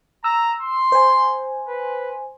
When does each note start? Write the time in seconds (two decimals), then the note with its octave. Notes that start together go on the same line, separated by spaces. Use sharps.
0.24 A#5 E6
0.61 C6
0.92 C5 G#5
1.68 B4